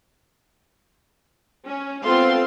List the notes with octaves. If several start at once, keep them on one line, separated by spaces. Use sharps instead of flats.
C#4
B3 C4 F4 A4 F5 C6